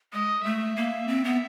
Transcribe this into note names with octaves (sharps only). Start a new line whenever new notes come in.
G#3 D#5
A3 E5
A#3
C4
B3